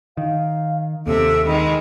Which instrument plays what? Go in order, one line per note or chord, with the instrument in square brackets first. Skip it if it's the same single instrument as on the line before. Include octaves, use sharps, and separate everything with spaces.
[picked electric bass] D#3 [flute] F5
[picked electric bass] D#2 [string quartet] C3 E5 [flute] A4
[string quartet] D#3 G#3 [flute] B5